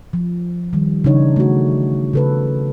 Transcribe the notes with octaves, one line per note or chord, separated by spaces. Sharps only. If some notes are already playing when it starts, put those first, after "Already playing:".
F3
D#3 G3
C#3 E3 D4 D#4 C#5
A3 F#4
C#3 A4 B4